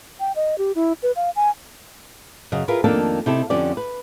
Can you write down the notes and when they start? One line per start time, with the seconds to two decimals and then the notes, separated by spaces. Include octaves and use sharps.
0.20 G5
0.36 D#5
0.58 G4
0.75 E4
1.03 B4
1.16 F5
1.36 G#5
2.52 F#2 C#3 D#5
2.68 E4 F4 G#4 A#4 B4
2.84 F2 D#3 A#3 D4 A4
3.26 C3 D#4 E4 G4 A4
3.50 F2 D3 F3 C#4 G4 D5
3.77 B4